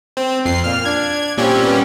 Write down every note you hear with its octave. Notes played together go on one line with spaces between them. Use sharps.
C4
F2 C7
A#2 F6
D4 G#6
A#2 G3 C4 C#4
B3